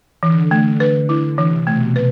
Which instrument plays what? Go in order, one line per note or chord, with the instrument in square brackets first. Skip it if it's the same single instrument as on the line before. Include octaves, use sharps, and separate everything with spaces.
[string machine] D3 [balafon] E3
[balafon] A3
B4
E4
[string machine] C3 [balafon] E3
[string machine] B2 [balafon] A3
[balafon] B4